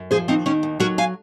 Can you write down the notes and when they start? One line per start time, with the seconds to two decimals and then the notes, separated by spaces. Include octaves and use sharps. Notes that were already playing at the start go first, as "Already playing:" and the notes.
Already playing: F#2
0.11 F3 G#4 C5
0.28 D#2 C4 D#4
0.46 D#3 C#4
0.63 D#2
0.80 F#3 F#4 A#4
0.98 F5 G#5